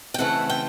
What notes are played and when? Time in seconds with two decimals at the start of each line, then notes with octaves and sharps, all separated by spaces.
0.14 G5
0.18 C#3 E3 A3 C4 F#5
0.50 G5